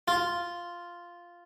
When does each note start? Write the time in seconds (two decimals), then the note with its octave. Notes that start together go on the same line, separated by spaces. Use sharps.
0.08 F4